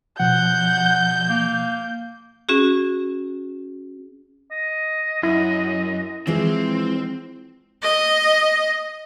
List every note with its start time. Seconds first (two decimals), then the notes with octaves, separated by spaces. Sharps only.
0.20 B2 F3 F#5 G6
1.29 A#3
2.49 C#4 F#4 G#4
4.52 D#5
5.23 F#2 E4
6.27 E3 F3 G#3 C4
7.82 D#5